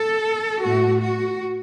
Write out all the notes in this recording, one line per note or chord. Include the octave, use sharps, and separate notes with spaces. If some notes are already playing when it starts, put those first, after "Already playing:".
Already playing: A4
A2 A3 F#4
F#4